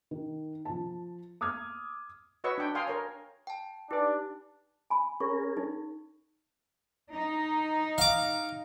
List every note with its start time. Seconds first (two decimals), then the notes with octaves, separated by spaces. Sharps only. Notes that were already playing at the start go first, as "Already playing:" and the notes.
0.11 D#3
0.65 F3 A5
1.41 D6 D#6 F6 G#6
2.44 F#4 B4 C#5 D#5 C#6 E6
2.58 D4 G5
2.75 F5 G5 G#5 C6 D#6
2.88 A#4 C#5
3.47 G5 A5
3.91 D4 D#4 G4 B4 D5
4.90 G#5 B5
5.20 C#4 G#4 A#4 C#6
5.57 D#4
7.14 D#4
7.98 F5 D6